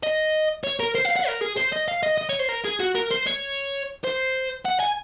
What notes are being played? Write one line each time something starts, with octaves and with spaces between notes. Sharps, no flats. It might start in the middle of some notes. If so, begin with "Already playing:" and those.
D#5
C#5
A#4
C5
F5
F#5
A#4
G#4
C5
D#5
F5
D#5
D#5
C#5
C5
A#4
G#4
F#4
A#4
C5
C#5
C5
F#5
G#5